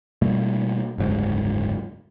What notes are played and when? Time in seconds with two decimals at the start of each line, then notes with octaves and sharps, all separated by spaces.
0.22 B2 G3 A3 A#3
0.98 F#1 D2 G#2 F#3